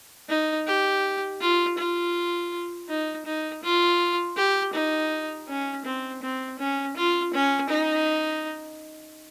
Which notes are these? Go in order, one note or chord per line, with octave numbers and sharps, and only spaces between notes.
D#4
G4
F4
F4
D#4
D#4
F4
G4
D#4
C#4
C4
C4
C#4
F4
C#4
D#4